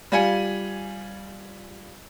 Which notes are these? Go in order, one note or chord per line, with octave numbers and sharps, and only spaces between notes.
G3 F4 G#5 C#7